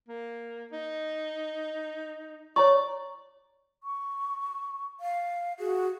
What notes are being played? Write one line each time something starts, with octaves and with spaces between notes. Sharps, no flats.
A#3
D#4
C#5 D5 A#5 C#6
C#6
F5
F#4 G#4